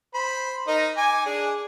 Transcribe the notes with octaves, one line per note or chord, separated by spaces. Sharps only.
C5 B5
D#4 A#4 D#5
G#5 D6
D4 G#4